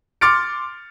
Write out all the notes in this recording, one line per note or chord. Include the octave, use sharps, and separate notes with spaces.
C6 D6 F6 A6 C#7 D7